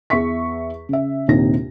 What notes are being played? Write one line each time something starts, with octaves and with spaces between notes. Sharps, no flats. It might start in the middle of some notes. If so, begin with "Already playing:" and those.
E2 G#4 E5 C#6 B6
C#3 E5
A#1 D#2 C3 D#4 A#6